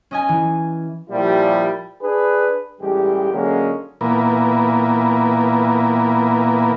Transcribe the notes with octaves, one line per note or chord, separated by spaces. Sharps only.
C#4 D#5 G#5
E3
A#2 F3 G3 E4 G4
D4 G#4 B4
A1 G3 G#3 G4
D3 F#3 G#3 A#3 C#4
A#2 E3 A#3 B3